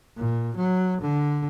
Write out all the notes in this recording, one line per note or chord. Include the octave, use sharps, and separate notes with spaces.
A#2
F#3
D3